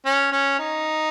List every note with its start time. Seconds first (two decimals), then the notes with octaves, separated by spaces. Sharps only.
0.06 C#4
0.32 C#4
0.59 D#4